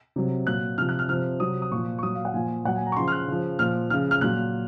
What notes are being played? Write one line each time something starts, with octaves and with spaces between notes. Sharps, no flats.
C3 F#3
A#2 F#3 F#6
C3 F3 F6
F#6
F6
C3 F3 F6
C3 F#3 D#6
D#6
A#2 F3 C#6
C#6
A#2 F#3 D#6
F5
F#5
A#2 F3 G#5
A#2 F#3 F#5
G#5
A#5
C#6
C#3 F3 C6
F6
F#6
C#3 F3
A#2 F3 F6
C#3 F3 F6
F6
A#2 F#3 F#6